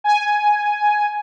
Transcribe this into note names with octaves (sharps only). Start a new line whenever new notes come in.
G#5